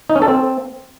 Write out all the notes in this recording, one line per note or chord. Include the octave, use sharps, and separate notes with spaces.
D#4
C#4
A4
C4